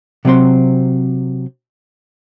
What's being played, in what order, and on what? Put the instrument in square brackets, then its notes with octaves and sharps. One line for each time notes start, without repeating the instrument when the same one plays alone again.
[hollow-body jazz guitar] C3 F#3 C4 C6